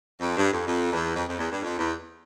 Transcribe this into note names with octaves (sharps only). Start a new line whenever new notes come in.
F2
G2
F2
F2
E2
F2
F2
E2
G2
F2
E2